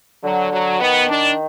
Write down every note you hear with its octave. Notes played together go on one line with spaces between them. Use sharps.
D3 F#3
F#3
D#3 B3
D4